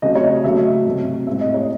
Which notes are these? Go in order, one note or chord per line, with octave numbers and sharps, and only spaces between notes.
C#3 F#3 A3 C4 D#5
C#5
D#5
C#3 F#3 A3 E5
C3 F#3 A3 C4
A2 G#3 C4 E5
D#5
C#5
D#5